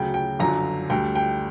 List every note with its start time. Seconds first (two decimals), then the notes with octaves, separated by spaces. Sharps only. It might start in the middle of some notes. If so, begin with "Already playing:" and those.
Already playing: D2 C#3 F#3 G5
0.14 G5
0.39 G1 F#2 D3 F#3 A#5
0.90 D2 D3 G3 G5
1.15 G5